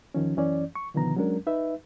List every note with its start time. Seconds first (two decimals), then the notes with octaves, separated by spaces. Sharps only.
0.14 E2 D#3 F3 C#4
0.36 F#2 E3 C#4 D5
0.75 C#6
0.94 B2 D3 D#3 F3 B3 A#5
1.16 F#3 G#3 C#4 D4 A#4
1.47 D#4 B4 E5